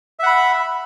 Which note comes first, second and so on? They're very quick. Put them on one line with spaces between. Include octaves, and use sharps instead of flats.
E5 F#5 B5